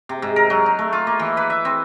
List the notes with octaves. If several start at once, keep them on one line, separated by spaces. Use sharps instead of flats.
C3
G#2
A#4
F#3
D#4
A3
F4
A#3
E3
B4
E5
C4